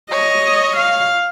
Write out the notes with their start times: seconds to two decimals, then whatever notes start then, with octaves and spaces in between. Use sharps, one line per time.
0.11 C#5 D#5
0.77 F5